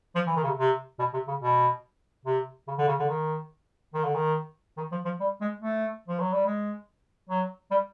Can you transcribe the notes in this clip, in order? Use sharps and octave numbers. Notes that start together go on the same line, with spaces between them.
F3
E3
D#3
C#3
C3
C3
B2
C3
C#3
B2
C3
C#3
D3
C#3
D3
D#3
D#3
D3
D#3
D#3
F3
F3
G3
G#3
A3
F3
F#3
G3
G#3
F#3
G3